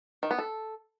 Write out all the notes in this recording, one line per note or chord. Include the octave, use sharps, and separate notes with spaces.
D#3
B3
A4